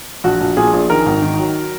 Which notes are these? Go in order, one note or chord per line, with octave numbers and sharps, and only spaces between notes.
A#1 F#4
A#1
A#2 G#4
A#1
D#3 A#4
G#1
D#3
F#3